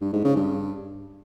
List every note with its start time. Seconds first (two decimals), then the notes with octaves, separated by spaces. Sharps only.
0.01 G2
0.13 G#2
0.25 C#3
0.36 G2